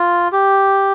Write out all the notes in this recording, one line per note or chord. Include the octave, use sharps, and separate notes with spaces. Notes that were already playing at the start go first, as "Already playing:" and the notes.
Already playing: F4
G4